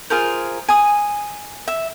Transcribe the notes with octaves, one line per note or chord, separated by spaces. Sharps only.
F4 G#4 A#4 C5
G#5 D#6
E5